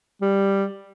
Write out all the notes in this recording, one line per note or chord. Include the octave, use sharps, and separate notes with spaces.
G3